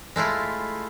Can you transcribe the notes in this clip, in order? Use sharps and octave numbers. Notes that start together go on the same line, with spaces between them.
G#3 A3 E4 F4